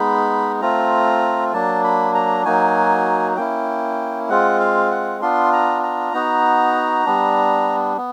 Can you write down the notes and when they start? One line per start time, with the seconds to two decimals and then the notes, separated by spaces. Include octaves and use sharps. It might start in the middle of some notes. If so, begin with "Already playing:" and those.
Already playing: G#3 B3 D#4 B5
0.61 A3 C4 F4 A#5
1.53 F#3 A#3 D4 A5
1.84 B5
2.14 A#5
2.45 F#3 A#3 D#4 F#4 G#5
3.37 A#3 C#4 E4 G5
4.29 G#3 C4 F4 F#5
4.60 F5
4.91 F#5
5.21 B3 D4 F4 C6
5.53 A#5
5.83 A#5
6.13 B3 D#4 F#4
7.05 G3 B3 D4
7.97 B3